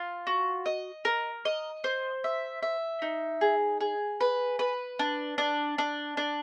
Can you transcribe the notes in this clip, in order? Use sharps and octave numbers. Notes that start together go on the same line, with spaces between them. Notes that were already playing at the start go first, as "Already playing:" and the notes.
Already playing: F4
F#4
D#5
A#4
D#5
C5
E5
E5
D#4
G#4
G#4
B4
B4
D4
D4
D4
D4